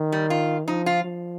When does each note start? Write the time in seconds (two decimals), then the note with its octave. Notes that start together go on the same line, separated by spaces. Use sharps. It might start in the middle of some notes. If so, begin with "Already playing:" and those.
Already playing: D#3
0.12 G3
0.30 F4
0.68 F3 D#4
0.86 F4
1.04 F3